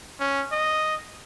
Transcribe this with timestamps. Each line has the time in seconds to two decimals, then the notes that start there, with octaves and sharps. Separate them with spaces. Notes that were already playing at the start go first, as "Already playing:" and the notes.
0.20 C#4
0.52 D#5